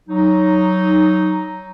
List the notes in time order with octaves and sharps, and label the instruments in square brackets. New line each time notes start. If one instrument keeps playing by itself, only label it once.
[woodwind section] F#3 D#4